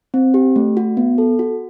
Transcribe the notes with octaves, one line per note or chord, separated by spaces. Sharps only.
C4
G4
A3
F#4
B3
A4
F#4